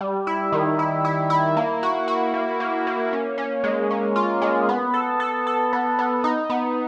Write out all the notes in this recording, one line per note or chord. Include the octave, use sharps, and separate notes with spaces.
G3
E4
D#3
E4
E4
E4
A#3
F#4
F#4
A#3
A#3
A#3
C#4
C#4
G#3
C#4
F4
G#3
B3
A4
A4
A4
B3
B3
D#4
B3